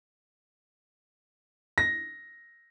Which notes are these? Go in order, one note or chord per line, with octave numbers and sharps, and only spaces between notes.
A#6